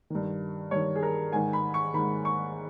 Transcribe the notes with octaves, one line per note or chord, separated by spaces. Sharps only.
G2 D#3
G2 D#3 C#5
G#4
A#4
G#2 D#3 G#5
B5
C#6
G#2 D#3 B5
C#6